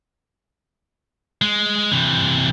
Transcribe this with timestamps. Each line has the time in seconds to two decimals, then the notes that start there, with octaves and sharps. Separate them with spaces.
1.42 G#3
1.92 C3 E3